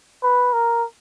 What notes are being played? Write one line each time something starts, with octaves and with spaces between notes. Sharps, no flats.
B4
A#4